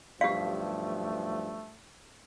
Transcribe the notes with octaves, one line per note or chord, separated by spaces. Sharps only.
B1 G2 F3 A3 G4 F5